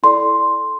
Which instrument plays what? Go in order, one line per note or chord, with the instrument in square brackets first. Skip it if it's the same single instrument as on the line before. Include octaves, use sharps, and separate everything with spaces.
[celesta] E4 A4 D5 C6